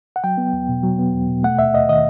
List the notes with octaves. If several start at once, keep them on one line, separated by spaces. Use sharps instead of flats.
F#5
F#3 G5
B3
E2
B2
F#3
B3
E2
B2
A3 F#5
D#2 E5
D#2 D#5
D#3 D#5